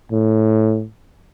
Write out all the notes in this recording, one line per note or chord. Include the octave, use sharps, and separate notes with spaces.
A2